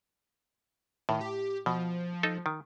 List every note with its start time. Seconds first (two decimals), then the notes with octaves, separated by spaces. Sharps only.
1.09 A2 D#3
1.21 G4
1.66 B2 F3
2.23 D#4 A4
2.46 D#3